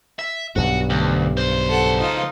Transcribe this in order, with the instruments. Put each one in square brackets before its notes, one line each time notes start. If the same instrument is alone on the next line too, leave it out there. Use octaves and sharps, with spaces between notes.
[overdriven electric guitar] E5
[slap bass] B1 G2 [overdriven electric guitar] F#4
[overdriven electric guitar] D2
C#2 C5
[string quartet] A4 F#5
D#4 F4